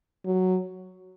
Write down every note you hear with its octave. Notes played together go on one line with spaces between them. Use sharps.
F#3